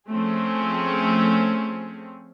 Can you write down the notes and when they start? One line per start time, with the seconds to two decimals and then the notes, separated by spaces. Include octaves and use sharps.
0.10 F3 A3 C4 C#4 G#4